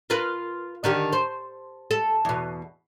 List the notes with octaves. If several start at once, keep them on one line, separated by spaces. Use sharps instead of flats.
F4 A#4 B4
D3 D#3 G4
C5
A4
E2 B2